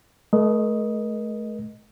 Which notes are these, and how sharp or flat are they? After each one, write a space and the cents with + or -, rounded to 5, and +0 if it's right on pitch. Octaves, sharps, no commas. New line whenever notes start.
A3 -35 A#4 +40 D#5 +0